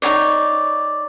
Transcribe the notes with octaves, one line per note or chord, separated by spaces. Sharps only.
D#4 F4 C#5 D5